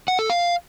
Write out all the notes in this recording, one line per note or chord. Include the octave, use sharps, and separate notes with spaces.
F#5
A4
F5